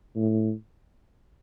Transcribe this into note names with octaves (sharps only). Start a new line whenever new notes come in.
A2